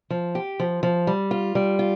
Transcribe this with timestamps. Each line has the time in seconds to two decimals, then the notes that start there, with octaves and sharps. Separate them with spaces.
0.10 F3
0.35 G4
0.60 F3
0.83 F3
1.07 G3
1.31 F4
1.55 G3
1.79 F4